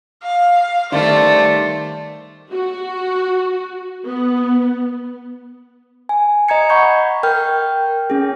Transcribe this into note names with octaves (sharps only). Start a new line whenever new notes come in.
F5
D#3 G3 A3 C5 D5
F#4
B3
G#5
D#5 A#5 G#6 C#7
F#5 B5 C#6 G6 G#6
A#4 G5 F6 G6
C#4 G#4